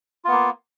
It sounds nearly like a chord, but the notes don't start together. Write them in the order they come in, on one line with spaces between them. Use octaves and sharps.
F4 B3 A#3